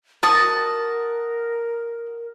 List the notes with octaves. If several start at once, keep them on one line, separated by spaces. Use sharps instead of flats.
F#4 A#4 A5 D#6